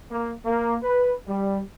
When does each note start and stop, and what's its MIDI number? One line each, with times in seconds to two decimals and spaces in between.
0.12 0.32 58
0.45 0.76 58
0.83 1.14 71
1.28 1.60 55